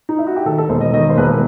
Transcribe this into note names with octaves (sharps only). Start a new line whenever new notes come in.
D#4
E4
F#4
G4
D#3 A4
A4
E1 C5
D#5
D#3 D#5
C5
E1 B4